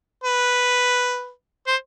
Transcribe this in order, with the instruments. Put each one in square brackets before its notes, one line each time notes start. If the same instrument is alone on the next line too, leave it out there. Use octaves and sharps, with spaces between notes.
[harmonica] B4
C5